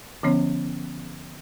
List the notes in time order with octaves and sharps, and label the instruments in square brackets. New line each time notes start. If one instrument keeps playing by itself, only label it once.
[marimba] D3 F3 B3 C#4 C#5